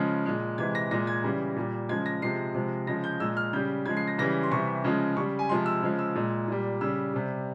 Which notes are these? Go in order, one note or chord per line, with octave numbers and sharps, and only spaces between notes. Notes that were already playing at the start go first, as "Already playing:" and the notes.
Already playing: C#3 F3 G#3
A#2 G#3
C3 E3 G#3 G#6
A#6
A#2 G#3 A#6
G#6
C#3 E3 G3
A#2 G3
C#3 F3 G#3 G#6
A#6
C3 F3 G#3 C7
C3 F3 G#3
C#3 F3 G#3 A#6
G6
A#2 G#3 E6
F6
C#3 G3 G6
C#3 F3 G#3 G#6
C7
A#6
C#3 E3 G3 A#6
C6
C3 E3 G3 C#6
C#3 F3 G#3
C#3 G3 C#6
G#5
C3 F3 G#3 C6
E6
C#3 F3 G#3
E6
A#2 G#3
A#2 G3
C#3 G3 E6
C3 G3